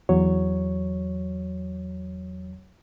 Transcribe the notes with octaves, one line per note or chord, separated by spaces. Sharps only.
E2 F#3 C#5